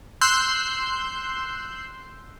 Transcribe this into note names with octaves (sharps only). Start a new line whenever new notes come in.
C6 E6 F#6 G6